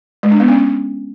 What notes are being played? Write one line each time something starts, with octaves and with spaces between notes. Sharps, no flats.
G#3
D4
B3
C#4